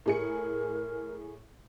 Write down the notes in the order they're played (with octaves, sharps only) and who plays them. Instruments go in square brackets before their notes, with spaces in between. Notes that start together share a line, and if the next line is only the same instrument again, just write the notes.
[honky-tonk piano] A2 G#4 C#7 [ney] A#4